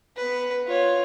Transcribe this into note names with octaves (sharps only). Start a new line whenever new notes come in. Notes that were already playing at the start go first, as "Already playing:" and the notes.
B3 B4
F4 C#5